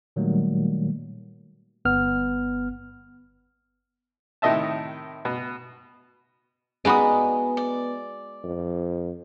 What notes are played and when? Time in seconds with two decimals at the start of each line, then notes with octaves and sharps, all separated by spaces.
0.16 A#2 D#3 F#3 G3 A3 A#3
1.85 G1 B3 F6
4.42 A2 C3 D#3 D#5 E5 A5
5.25 B2
6.85 G#3 B3 D#4 F#4 D5 B5 D#6
7.57 D5
8.44 F2